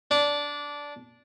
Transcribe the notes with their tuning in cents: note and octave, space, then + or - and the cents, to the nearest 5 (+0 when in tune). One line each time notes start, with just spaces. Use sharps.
D4 -15